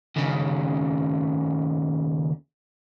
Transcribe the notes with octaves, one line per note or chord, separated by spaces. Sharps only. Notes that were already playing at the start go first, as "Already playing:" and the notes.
D#2 C#3